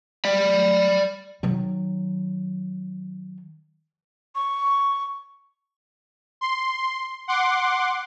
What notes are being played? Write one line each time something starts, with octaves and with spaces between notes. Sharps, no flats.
D5 B5
D#3 F#3
C#6
C6
F#5 C6 D6